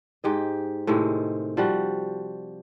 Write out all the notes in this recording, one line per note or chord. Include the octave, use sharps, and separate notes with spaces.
G#2 G4 D#5
A2 C3 D#3 G#3
F3 G3 F#4